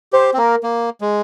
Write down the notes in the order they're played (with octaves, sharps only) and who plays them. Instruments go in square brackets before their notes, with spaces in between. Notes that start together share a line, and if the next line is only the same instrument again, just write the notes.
[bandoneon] G4 [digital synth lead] C5
[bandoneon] C4
[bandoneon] A#3 [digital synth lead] A#4
[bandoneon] A#3
G#3